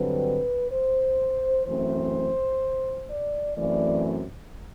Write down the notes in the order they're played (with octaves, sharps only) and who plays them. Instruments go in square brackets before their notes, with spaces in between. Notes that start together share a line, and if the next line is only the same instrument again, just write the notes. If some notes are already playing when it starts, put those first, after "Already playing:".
Already playing: [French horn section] G2 D3 F#3 C4 B4
C5
F#2 E3 A3 C4 C5
D5
F#2 E3 A3 C4 D5